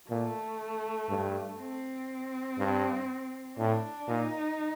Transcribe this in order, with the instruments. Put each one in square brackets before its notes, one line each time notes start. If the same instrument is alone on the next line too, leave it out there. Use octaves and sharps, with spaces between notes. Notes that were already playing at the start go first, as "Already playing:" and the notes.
[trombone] A#2 [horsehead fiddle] A3
[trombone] G2
[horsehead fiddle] C4
[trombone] G2
[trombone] A2 [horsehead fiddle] D4
[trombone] A#2 [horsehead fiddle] D#4